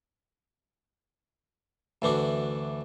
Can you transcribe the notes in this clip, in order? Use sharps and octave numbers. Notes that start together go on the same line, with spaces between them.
D2 E3 D4 F#4